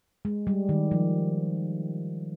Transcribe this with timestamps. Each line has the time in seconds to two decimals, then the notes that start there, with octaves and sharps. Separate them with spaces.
0.25 G#3
0.47 G3
0.69 D#3
0.91 F3